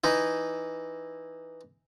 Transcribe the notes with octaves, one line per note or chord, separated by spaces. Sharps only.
E3 D#4 E4